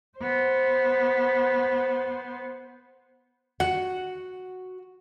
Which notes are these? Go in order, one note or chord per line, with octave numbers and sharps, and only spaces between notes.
B3 C5
F#4 F#5